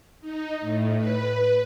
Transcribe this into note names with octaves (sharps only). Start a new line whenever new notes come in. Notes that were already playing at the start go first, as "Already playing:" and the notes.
D#4
A2
B4